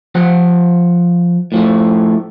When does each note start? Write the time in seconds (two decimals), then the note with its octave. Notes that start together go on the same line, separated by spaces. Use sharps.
0.15 F3 C5 F#5
1.52 A2 F3 A3